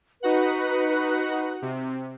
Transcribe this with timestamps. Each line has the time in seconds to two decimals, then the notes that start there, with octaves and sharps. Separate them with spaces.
0.23 D#4 F#4 B4 F#5
1.62 C3